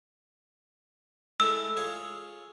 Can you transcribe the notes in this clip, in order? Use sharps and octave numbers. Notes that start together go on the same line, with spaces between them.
G#3 E4 A4 E6
F4 G#4 C#5